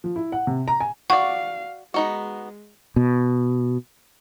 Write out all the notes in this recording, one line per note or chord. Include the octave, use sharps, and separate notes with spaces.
F3
E4
F#5
C3
A#5
G#5
F#4 D5 F5 F#5 C#6
G#3 B3 D#4 F#4
B2